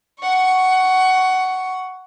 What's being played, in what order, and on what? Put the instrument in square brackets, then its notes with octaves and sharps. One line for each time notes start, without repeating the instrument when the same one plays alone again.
[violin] F#5 C#6